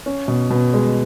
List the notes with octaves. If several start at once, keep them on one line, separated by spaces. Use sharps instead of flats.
C#4
B2
B2
G#3